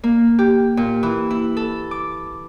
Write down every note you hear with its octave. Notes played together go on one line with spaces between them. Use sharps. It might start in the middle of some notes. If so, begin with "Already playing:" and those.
A#3
G4
A#2
E3
E4
A4
D6